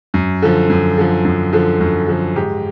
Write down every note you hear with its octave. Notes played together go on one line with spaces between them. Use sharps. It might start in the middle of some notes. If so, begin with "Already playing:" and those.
F#2
D3 F3
F#2
D3 F3
F#2
D3 F3
F#2
D3 F3
G#2 G4